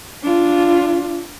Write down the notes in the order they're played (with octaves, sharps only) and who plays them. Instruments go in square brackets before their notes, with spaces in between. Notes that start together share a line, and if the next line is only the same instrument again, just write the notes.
[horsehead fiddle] D4 F4